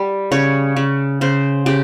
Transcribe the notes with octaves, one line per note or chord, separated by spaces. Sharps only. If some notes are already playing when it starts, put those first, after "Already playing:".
Already playing: G3
C#3 C#5
C#3
C#3 C5
C#3 G4